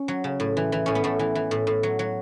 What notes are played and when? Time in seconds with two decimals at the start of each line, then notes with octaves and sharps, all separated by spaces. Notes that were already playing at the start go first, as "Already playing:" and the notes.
Already playing: C#4
0.08 F#3
0.24 C#3
0.40 A2
0.57 E3
0.72 E3
0.86 A2 C#4
0.95 B3
1.04 A2 A3
1.19 E3
1.35 E3
1.51 A2
1.67 A2
1.83 F#3
1.99 F#3